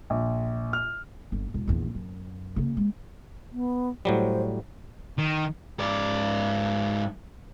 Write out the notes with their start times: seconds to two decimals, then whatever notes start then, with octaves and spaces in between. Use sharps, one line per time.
0.10 A#1
0.73 F6
1.32 G1
1.54 E1
1.68 A#1 E2
1.95 F#2
2.56 C#3 A#3
2.77 G#3
3.52 B3
4.05 A2 F#3 G3 C5
5.19 D#3
5.80 G#2 D5